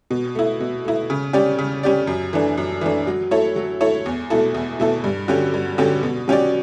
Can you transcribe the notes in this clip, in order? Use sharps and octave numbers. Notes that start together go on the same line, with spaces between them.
B2
A3 E4
B2
A3 E4
C#3
G3 C#4 G4 D5
C#3
G3 C#4 G4 D5
F#2
E3 A3 D4
F#2
E3 A3 D4
F#3
A3 E4 A4 C#5
F#3
A3 E4 A4 C#5
E2
B2 A3 E4 A4
E2
B2 A3 E4 A4
G2
D3 F#3 C#4 G4
G2
D3 F#3 C#4 G4
B2
F#3 C#4 G4 D5